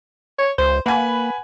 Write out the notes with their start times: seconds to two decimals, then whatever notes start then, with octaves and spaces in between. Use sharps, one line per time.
0.38 C#5
0.58 C#2 C5
0.86 A#3 B4 F#5 G#5 B5